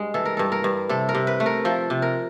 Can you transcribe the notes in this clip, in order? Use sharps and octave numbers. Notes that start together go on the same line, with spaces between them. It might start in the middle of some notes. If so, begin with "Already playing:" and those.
Already playing: G2 G#3
E3 A4
A#4
G2 A4
A#4
G2
C3 A4
A#4
C3
B4
A3
A#4
F3 A4
C3
A#4